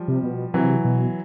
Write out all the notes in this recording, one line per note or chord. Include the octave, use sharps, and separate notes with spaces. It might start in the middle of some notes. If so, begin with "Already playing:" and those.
Already playing: F3 G3
C3
B2
C3 E3 F#3
B2